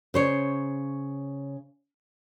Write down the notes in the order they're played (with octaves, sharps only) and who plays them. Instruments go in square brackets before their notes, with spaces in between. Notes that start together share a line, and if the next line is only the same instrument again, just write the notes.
[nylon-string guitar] C#3 C5 C#5